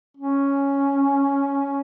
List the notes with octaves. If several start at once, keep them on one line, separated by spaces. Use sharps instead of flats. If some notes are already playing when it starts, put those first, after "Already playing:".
C#4